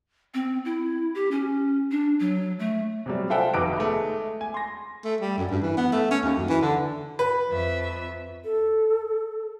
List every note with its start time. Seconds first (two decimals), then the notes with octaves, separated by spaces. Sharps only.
0.34 C4
0.65 E4
1.15 G4
1.31 C#4
1.91 D4
2.20 F#3
2.59 A3
3.06 C3 F#3 G3
3.30 F4 A4 C5 E5 F#5 G5
3.54 F1 D#4 F#4 B4 D6 D7
3.78 G#3 A3
4.41 G#5
4.54 C6 A#6
5.04 A3
5.21 G3
5.38 F#2
5.51 G2
5.62 E3
5.77 B3
5.93 A3
6.11 C#4
6.24 D#2
6.36 F#2
6.49 E3
6.62 D3
7.19 B4
7.48 F2 E5
8.45 A4